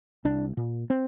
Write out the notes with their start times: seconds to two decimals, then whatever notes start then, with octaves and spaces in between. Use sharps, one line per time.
0.25 C2 D4
0.57 A#2
0.90 C4